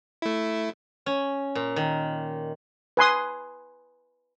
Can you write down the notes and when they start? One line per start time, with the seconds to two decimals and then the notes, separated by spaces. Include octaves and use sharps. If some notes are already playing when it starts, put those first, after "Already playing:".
0.22 A3 E4
1.06 C#4
1.55 A#2
1.76 D#3
2.97 B4 G#5 C6 D#6